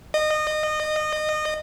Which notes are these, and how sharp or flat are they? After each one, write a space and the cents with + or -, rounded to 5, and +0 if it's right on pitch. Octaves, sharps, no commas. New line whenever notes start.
D#5 -25